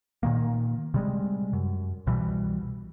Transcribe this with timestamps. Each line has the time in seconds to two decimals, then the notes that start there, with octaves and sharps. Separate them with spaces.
0.23 A#2 D#3 A#3
0.94 C3 G3 G#3
1.53 F#2
2.06 C2 B2 E3 G3